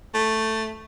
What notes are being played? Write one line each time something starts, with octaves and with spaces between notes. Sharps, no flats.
A3